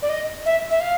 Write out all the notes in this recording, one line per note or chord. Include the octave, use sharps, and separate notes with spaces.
D5
D#5
E5
E5
F5